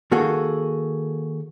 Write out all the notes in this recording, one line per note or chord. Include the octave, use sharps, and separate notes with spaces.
D#3 A#3 F#4 G#4 A4